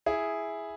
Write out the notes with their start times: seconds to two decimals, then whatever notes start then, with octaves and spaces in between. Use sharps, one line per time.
0.06 E4 G#4